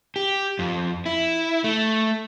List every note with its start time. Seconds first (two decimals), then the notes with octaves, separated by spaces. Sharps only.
0.16 G4
0.59 F2
1.06 E4
1.64 A3